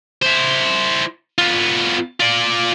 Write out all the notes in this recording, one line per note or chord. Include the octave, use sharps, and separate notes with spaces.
E4 C5
B3 F4
F4 D5